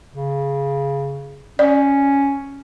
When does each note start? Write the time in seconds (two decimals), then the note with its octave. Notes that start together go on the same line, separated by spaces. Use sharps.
0.12 C#3
1.59 C#4 D5